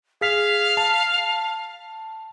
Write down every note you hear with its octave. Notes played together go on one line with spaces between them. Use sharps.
G#4 F5 B6
A5